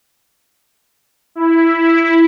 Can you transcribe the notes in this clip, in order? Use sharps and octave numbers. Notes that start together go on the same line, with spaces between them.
E4